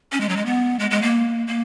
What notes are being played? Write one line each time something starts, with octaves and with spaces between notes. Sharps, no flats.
C#4
G#3
F#3
G#3
B3
G#3
G#3
A#3
A#3